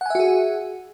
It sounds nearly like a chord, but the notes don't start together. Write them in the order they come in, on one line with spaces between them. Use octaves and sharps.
F#5 G#5 E5 F#4 G#4